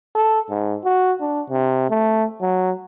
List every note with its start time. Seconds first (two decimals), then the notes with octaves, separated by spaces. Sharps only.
0.15 A4
0.50 G#2
0.85 F#4
1.21 D4
1.50 C3
1.90 A3
2.41 F#3